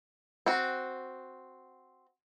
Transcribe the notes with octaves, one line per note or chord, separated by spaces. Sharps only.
C4 F#4